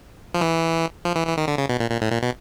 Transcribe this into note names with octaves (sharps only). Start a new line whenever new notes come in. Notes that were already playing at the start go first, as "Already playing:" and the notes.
F3
E3
F3
E3
E3
D#3
D3
C#3
B2
A#2
A#2
A2
A#2
B2